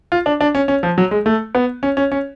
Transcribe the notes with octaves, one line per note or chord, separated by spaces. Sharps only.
F4
D4
D4
C#4
C#4
F3
F#3
G#3
A3
B3
C#4
C#4
C#4